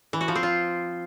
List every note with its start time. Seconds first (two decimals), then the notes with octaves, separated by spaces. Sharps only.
0.13 E3
0.21 F#4
0.28 F3
0.36 C4
0.43 F4